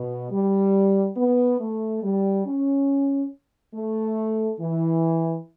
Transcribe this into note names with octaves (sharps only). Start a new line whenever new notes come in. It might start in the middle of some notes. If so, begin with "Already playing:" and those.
Already playing: B2
G3
B3
A3
G3
C#4
A3
E3